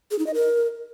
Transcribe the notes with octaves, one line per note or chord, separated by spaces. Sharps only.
G#4
D#4
D#5
A#4